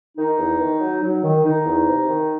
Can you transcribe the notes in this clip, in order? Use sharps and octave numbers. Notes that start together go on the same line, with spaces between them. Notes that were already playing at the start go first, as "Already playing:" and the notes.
D#3 D#4
E2
D#3
F#3
F#3
D#3
D#3 D#4
E2
C3
D#3